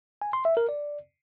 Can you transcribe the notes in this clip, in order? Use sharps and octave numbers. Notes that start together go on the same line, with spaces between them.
G#5
C6
E5
A#4
D5